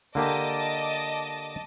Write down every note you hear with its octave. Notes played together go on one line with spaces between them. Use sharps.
D3 A#3 G4 D#5 A5 D6